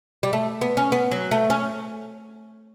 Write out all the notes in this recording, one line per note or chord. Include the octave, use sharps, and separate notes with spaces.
G3
A3
B3
C#4
B3
F#3
A3
C#4